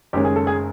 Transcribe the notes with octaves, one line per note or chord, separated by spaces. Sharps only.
F#1 F#2 D#3 G#3 C#4 G4
G#4
A4
G#4